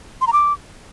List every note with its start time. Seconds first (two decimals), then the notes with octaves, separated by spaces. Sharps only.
0.21 C6
0.27 A#5
0.33 D6